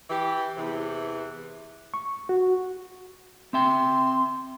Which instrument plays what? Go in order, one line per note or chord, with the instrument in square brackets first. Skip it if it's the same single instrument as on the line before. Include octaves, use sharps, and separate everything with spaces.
[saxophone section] E3 G4
E2 C3 E3
[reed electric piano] C#6
F#4
[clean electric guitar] C4 E5 G5 [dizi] C6